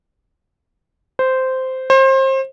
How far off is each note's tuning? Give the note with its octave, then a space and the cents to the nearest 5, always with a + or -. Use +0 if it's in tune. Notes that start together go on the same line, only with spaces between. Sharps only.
C5 -10
C5 +30